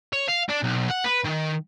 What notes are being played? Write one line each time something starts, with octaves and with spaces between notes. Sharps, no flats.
C#5
F5
D4
B1
F#5
B4
D#3